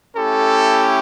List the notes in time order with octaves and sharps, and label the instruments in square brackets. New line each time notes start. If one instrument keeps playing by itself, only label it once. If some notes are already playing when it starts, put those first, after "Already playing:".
[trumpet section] A3 C#4 E4 G4 A4